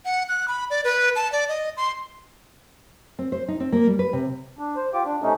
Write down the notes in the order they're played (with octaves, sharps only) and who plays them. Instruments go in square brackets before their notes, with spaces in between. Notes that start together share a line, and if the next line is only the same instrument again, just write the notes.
[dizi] F#5
F#6
B5
D5
B4
A5
D5
D#5
C6
[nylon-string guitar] C4
C5
D#4
C4
A#3
G3
B4
C3
[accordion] D4
C5
F4 G4 D6
D4
C3 A3 C#4 D#4